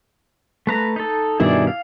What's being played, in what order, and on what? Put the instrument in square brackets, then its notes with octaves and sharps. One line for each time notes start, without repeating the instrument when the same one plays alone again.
[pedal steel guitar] A3 B4 A#5
D#4 A4
[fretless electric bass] G2 B2 D#3 [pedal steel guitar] E4 G#4 D5
[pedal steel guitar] F5